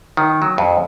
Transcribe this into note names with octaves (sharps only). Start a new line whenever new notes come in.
D#3
F#3
F2